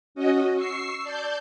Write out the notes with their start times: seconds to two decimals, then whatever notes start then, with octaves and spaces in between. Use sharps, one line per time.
0.15 C#4 F#4 D#5
0.55 C#6 E6 C7
1.02 D5 A5 G6